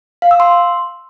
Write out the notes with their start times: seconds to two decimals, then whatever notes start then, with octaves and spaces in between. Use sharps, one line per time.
0.22 F5
0.31 E6
0.40 C6